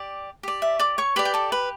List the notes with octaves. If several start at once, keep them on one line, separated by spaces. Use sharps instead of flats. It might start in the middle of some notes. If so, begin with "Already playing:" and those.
Already playing: G4 D5
G4 D5
E5
D5 D6
C#5 C#6
G4 B4 D5 B5
G5
A4 A5
B4 B5